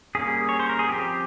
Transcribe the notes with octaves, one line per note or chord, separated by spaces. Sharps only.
G3 A#3 C#4 G#4
C#5
C5
A#4
G#4
F3 C4 G4